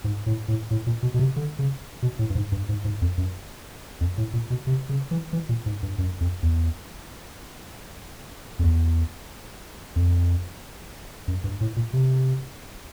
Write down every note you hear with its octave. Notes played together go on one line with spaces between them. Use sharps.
G#2
A2
A2
A2
A#2
B2
B2
C3
D3
C#3
B2
A2
G2
G#2
G2
G#2
G#2
F2
F#2
F2
A2
A#2
B2
C3
C#3
E3
E3
A#2
G#2
G2
F#2
F2
E2
F2
E2
F2
F#2
G2
A2
A#2
C3